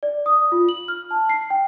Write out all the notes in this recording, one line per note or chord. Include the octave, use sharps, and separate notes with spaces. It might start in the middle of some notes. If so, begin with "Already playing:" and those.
D5
D#6
F4
F#7
F6
A5
C7
G5